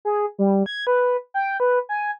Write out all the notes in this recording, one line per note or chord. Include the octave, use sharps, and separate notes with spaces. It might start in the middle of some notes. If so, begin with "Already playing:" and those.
G#4
G3
G#6
B4
G5
B4
G#5